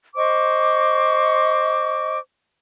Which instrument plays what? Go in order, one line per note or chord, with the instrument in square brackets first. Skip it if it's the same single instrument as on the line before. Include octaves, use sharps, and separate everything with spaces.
[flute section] C5 D#5 C#6 D6